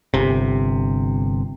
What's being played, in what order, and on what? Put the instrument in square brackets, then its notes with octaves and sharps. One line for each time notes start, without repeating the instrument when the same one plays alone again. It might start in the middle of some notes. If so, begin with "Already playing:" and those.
[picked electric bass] G1 C3